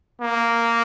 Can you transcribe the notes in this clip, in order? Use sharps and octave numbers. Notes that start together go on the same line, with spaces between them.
A#3